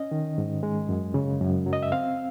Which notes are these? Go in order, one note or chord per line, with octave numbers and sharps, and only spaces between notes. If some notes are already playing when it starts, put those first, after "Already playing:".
Already playing: C#4 D#5
D#3
G#2
G#3
F#2
C#3
F#2
F#3
D#5
E5
C4 F5